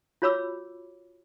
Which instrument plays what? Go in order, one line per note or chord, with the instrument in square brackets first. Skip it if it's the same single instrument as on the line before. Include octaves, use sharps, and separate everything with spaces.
[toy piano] F4 F#4 C#5 B5 D6 E6